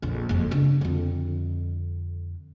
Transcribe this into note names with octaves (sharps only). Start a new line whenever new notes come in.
A#1 F2
F#1 F2
C#3 D4
F2 D3